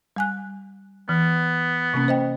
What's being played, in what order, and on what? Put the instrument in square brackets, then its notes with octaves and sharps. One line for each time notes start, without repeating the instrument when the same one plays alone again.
[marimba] G3 G#5 F#6
[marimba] E3 [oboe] B3
[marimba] C3 A#3 C#4
C5 D#5 G5